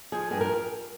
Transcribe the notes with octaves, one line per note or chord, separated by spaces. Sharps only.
F3 G#4
G2 G#4
A#4